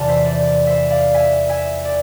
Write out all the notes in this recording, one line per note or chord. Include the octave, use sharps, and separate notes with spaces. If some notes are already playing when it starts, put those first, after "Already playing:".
Already playing: F1 E2 C3 E3 D5 A5
C5 E5
D5
D5
C5 E5
D5 F5
E5 G#5
E5 G#5
D5